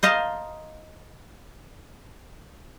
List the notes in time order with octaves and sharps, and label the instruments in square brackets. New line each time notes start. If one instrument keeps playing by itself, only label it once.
[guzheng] C5 D#5 F5 A5 A#5